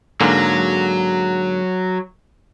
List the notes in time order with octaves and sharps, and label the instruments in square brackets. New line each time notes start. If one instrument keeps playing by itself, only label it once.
[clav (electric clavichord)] G#2 D3 A#3 [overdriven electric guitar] F#3